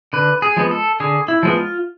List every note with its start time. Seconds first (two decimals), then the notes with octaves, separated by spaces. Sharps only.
0.13 D3 B4
0.42 G#4
0.57 F3 G#3 B3
0.71 A4
1.00 D3 G#4
1.28 E4
1.43 F3 G#3 B3
1.57 F4